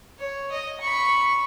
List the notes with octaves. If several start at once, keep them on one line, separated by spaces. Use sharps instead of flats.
C#5
D#5
B5 C#6